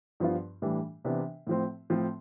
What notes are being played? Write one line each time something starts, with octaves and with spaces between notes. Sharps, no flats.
G2 F3 B3 F4
A2 E3 G3 D4
C3 E3 B3 D4
A2 F3 C4
A2 F3 C4